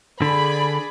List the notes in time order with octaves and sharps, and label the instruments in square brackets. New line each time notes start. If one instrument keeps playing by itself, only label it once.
[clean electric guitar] D3 [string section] G#4 D5 B5